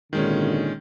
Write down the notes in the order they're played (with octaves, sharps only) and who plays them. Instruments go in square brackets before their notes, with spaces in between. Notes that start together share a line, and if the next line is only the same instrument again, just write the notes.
[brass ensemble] G#1 A#2 D3 [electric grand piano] D#3 G#3 C#4